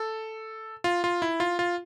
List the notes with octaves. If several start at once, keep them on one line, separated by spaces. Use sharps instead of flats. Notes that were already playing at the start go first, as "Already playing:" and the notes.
Already playing: A4
F4
F4
E4
F4
F4